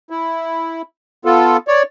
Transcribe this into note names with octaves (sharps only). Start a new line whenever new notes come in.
E4
B3 F4 A4
C#5 D5